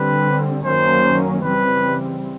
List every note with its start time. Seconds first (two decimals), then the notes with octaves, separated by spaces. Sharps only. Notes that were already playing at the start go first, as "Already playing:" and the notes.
Already playing: D3 G3 C4 B4
0.64 F#2 D#3 F#3 A#3 C#4 C5
1.43 C#3 E3 G3 C4 B4